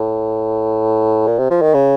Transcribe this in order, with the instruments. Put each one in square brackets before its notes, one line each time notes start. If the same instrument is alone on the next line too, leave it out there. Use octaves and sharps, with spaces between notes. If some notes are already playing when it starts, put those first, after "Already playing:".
Already playing: [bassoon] A2
A#2
C3
F3
D#3
C#3